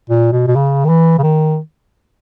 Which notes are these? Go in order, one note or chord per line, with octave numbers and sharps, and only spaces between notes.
A#2
B2
B2
C#3
D#3
E3
C#3
D#3